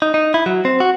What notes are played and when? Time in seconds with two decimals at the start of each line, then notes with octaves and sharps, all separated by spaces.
0.02 D#4
0.14 D#4
0.34 E4
0.46 F#3
0.65 C4
0.80 F#4